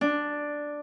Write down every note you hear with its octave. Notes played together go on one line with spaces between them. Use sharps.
D4